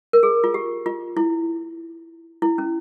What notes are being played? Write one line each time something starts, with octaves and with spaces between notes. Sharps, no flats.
A#4
G#4
F4
G4
F4
E4
E4
C#4